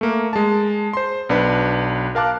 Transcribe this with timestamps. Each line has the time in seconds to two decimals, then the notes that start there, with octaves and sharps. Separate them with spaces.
0.01 A3 A#3
0.33 G#3 A5
0.93 C5 C6
1.29 B1 D4 B4
2.15 A#4 F5 A5 D6 F#6